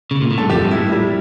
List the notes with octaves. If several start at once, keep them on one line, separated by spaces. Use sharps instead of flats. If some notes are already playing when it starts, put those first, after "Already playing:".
C#3
A#2
A2
G2 A4
F2 G4
G2
E4
A2
G3